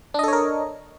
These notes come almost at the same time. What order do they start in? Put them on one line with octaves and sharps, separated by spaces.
D4 D#5 A4 C#5 A#4